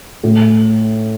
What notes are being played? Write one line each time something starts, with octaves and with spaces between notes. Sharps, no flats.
A2